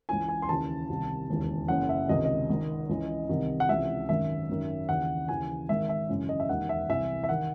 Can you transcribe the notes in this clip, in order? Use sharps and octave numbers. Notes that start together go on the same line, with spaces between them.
C#2 C#3 E3 G#5
G#5
C6
D#2 C#3 E3 A5
C2 C3 D#3
E1 D#2 C#3 E3
F#1 F#2 C#3 E3 F#5
E5
C#2 C3 D#3 D#5
D#5
G#1 G#2 D#3
C#2 C#3 E3
C2 C3 D#3
F#5
C#2 C3 E3 E5
G#1 F#2 D#3 E5
G#1 F#2 D#3
D#2 C#3 E3 F#5
D#2 C#3 E3 G#5
G#1 G#2 D#3 E5
E5
G#1 F#2 C#3 E3
D#5
E5
E1 D#2 D#3 F#5
E5
C2 C3 E3 E5
E5
D#3 F#5